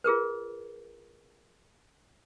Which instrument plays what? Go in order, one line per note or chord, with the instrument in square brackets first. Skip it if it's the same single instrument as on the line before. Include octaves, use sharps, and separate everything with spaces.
[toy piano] F4 G#4 A#4 B4